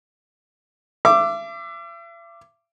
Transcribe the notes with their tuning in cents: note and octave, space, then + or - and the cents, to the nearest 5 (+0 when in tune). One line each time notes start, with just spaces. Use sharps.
E5 +40 D6 +0